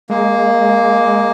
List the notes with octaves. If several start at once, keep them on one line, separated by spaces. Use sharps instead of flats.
G#3 A#3